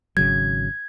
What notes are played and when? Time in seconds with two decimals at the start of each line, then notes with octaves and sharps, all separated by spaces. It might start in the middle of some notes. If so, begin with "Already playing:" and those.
0.17 G#1 C#3 F#3 G#6